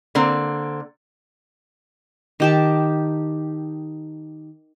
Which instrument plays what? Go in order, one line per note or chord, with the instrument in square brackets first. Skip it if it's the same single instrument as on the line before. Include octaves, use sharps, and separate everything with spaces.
[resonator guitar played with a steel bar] D3 A#3 C4
[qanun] D#3 G4 A5